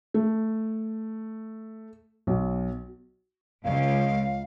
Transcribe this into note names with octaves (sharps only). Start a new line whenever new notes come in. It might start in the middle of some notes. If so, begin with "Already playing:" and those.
A3
B1
C#2 F5